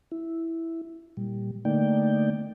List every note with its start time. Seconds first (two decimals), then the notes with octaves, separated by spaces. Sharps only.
0.12 E4
1.17 A#2 G3
1.65 D3 A3 A#3 D#4 D5 G5